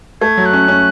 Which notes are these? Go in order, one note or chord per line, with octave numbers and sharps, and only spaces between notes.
A3 G#6
F#3
F#6
C#4
C#4